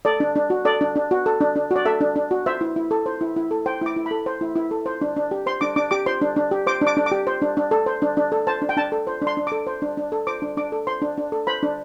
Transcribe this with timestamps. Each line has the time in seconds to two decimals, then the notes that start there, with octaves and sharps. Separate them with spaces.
0.05 A4 D5
0.20 D4
0.36 D4
0.50 F#4
0.65 A4 D5
0.81 D4
0.96 D4
1.11 F#4
1.26 A4
1.41 D4
1.56 D4
1.71 F#4
1.76 D5
1.85 A4 E5
2.01 D4
2.16 D4
2.31 F#4
2.46 C5 E5
2.61 E4
2.76 E4
2.91 A4
3.06 C5
3.21 E4
3.36 E4
3.51 A4
3.66 C5 G5
3.81 E4 D6
3.96 E4
4.06 B5
4.11 A4
4.26 C5
4.41 E4
4.56 E4
4.71 A4
4.86 C5
5.01 D4
5.16 D4
5.31 G4
5.46 C5 C6
5.61 D4 D6
5.76 D4 D6
5.91 G4 D6
6.06 C5 C6
6.21 D4
6.36 D4
6.51 G4
6.67 C5 D6
6.81 D4
6.87 D6
6.97 D4
7.06 D6
7.12 G4
7.27 C5
7.42 D4
7.57 D4
7.71 A4
7.86 C5
8.02 D4
8.17 D4
8.32 A4
8.47 C5 A5
8.62 D4
8.69 G5
8.77 D4 A5
8.92 A4
9.07 C5
9.22 D4
9.27 C6
9.37 D4
9.47 A4 D6
9.67 C5
9.82 D4
9.97 D4
10.12 A4
10.27 C5 D6
10.42 D4
10.57 D4 D6
10.72 A4
10.87 C5 C6
11.02 D4
11.17 D4
11.32 A4
11.47 C5 B5
11.63 D4